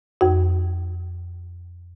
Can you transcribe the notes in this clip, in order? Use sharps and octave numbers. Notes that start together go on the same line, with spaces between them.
F2 F#4